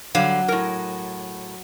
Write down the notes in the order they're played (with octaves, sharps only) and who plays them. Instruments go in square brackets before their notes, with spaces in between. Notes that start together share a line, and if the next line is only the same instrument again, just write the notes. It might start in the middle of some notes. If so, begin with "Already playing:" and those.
[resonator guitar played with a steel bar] D3 G3 F5 [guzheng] F#3
[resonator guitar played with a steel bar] A2 A#4